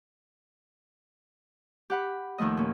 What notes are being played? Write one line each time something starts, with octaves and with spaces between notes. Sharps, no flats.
G4 F#5 B5
D#2 D#3 F3 A3 D#5
A#2 C#4